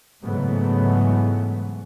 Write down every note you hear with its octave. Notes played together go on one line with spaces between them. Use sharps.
G#2 C#3 E3 F#3 A3 B3